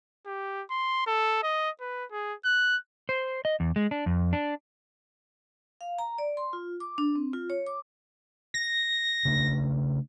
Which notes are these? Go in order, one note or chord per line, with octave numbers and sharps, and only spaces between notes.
G4
C6
A4
D#5
B4
G#4
F#6
C5
D#5
E2
G#3
D4
F2
D4
F5
A#5
D5
C6
F4
D6
D4
C4
F4
C#5
D6
A#6
C#3 A3 D4